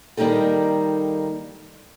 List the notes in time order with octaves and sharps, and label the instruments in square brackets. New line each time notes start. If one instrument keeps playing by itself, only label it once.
[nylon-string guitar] D#3 G3 A#3 D#4 G4 A4